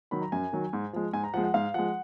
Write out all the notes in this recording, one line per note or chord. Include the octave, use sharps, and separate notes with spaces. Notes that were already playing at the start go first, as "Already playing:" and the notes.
D#3 F#3 B5
A#5
F#2 G#5
D#3 F#3
G#2
F3 G#3
G#2 G#5
A#5
F3 G#3 F#5
F#5
G#2 F5
F3 G#3 F#5